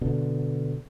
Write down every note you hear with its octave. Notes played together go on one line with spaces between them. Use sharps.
B2 D3